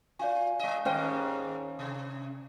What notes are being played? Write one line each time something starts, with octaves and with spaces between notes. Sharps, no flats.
F4 D5 F5 G#5
G#3 D#5
D#2 G#2 C#4 C5 D#5 G5
C3